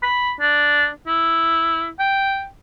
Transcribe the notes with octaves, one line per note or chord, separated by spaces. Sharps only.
B5
D4
E4
G5